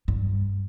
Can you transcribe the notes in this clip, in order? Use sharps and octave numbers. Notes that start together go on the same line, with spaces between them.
G2